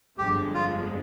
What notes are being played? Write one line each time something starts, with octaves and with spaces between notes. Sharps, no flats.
G1 F2 D3 F3 G#3 G4
F4